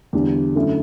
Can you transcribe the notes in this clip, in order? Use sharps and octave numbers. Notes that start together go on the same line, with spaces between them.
E2 D3 G3
F#2 D3 A3 E4